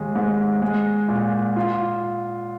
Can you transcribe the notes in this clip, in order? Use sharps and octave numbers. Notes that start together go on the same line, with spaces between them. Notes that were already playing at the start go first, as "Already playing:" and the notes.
Already playing: D#2 G#3
G#2
G#3
A#2
F4